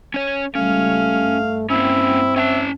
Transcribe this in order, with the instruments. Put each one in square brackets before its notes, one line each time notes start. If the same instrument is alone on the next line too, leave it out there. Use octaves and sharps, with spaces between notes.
[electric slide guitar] C#4 C#5
[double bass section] C#2 G3 [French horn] A3 [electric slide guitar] C#4 [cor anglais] F5
[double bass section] G2
[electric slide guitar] A#3 C#4 [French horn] C4 [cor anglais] E4
[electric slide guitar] C#4 G5 A5 [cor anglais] E5